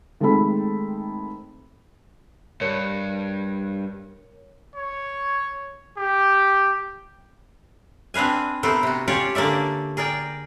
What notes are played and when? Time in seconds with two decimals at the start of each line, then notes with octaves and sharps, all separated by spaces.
0.20 D#3 G#3 A3 C4 A4 B5
2.61 G2 A#4 C#5 C#7
4.75 C#5
5.97 G4
8.14 C4 D4 B4 F5 G#5
8.63 C3 A3 B3 A4 A#4 C5
8.83 C3 F#4
9.08 C#4 F4 G4 C#5 D5
9.35 D3 A#3 C#4 D5 E5
9.97 G#4 A#4 D5 G5